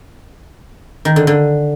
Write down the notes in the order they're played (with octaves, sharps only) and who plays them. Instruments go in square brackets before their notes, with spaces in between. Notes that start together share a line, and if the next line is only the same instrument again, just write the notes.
[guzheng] D#3
D3
D3